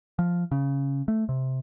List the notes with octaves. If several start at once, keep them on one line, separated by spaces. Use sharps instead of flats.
F3
C#3
A3
C3